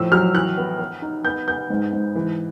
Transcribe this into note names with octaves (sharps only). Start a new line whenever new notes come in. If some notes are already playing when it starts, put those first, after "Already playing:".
Already playing: A2 F3 E6
F#3 F6
E3 F#6
B3
B3
D#4
B3 G6
B3 G6
G#2
G#2
E3